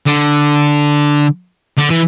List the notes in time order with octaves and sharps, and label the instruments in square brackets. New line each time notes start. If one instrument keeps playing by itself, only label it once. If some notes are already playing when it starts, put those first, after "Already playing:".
[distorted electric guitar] D3
D3
E3